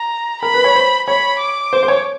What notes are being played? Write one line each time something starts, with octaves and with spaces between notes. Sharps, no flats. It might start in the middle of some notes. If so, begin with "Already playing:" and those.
Already playing: A#5
A#4 B5
B4
C#5
C5
C#5 B5
D6
C5
C5
C#5